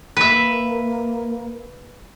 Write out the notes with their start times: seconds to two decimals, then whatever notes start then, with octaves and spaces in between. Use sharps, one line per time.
0.17 A#3 B4 E5